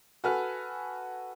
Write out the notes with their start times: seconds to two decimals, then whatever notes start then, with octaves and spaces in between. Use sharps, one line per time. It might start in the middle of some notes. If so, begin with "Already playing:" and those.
0.24 F#4 A4 B4 G#5 F6